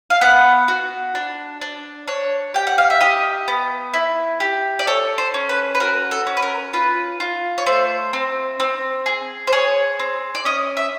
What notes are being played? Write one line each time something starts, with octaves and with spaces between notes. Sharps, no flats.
F5
B3 F#5
F#4
D4
D4
D4 C#5
G4 G5
F#5
F5
E5
G4 D#5
B3
E4
G4
D5
A4 C#5
C5
C#4
B4
B4
F#4 A#4
A4
C#4
B4
A#4
F4 B4
F4
C#5
A3 C5
C4
C4
G#4
C5
G#4 C#5
C4
D5
C#4 D#5
E5